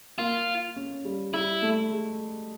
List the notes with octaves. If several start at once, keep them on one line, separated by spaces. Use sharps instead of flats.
A#3 F4
C#4
G3
G3 E4
A3
G#3